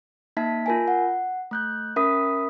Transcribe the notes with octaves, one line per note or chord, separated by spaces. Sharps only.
A#3 D#4 E5 A5 B6
F4 A#4 G#5
F#5
A3 F#6 G6
C#4 A#4 E5 B5 D#6 B6